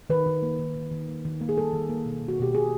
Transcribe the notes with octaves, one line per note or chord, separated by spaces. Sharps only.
D#3 B4
D#3
A#3
D#3
D#3
D#3
A#3
D#3
A#3
G#4
G3 A4
D#3
A#3
B2
B2
F#4
B2 G4
B2 G#4